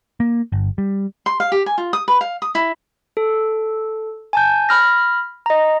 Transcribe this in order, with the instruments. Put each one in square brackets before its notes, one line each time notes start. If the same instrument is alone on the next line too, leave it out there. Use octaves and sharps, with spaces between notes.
[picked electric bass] A#3
G1
G3
[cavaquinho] C6
F5
G4
G#5
F4
D#6
B4
F5
D#6
E4
[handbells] A4
G#5 A5 G6
B5 F6 A#6
D#5 A#5